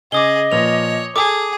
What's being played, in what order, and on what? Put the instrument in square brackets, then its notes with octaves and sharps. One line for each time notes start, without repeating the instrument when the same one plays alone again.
[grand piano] C#3 [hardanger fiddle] G#4 [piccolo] D#5 [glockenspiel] D6 D#6 G7
[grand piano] A#2 F3 B4 [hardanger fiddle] C#5 [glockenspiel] F7
[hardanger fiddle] G#4 [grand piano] A4 [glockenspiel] D6 D#6